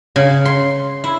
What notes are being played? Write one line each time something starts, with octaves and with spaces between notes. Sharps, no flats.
C#3
C6
E4